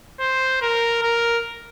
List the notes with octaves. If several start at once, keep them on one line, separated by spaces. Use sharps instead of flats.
C5
A#4
A#4